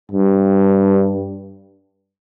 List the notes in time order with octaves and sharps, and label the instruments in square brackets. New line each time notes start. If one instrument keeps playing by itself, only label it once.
[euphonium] G2